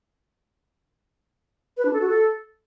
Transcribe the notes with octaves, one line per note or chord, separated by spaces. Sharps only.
B4
D4
A4
F#4
A4